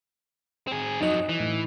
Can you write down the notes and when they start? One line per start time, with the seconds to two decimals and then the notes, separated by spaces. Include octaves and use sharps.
0.67 C4 G#4
1.01 F2 F#3 D#4 D#5
1.29 E3
1.40 A2